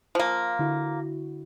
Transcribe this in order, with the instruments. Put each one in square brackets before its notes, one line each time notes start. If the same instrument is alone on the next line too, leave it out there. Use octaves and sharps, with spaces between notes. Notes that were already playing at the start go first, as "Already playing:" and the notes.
[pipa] F3 A#3
[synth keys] D3 E4 F#4